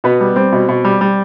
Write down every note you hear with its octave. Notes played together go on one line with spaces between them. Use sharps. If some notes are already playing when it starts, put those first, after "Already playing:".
B2 B3
G3
G3 C4
B2
B2
G3
G3